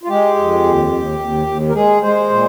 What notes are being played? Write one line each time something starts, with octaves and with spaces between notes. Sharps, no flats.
F4
G#3 G4
F2
D#2
D#2
D#2
D#2
A#4
G#3 G#4
G#3 C5
A#2